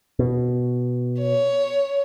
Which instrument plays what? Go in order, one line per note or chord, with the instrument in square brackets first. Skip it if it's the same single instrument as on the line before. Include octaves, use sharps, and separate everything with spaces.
[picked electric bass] B2
[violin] C#5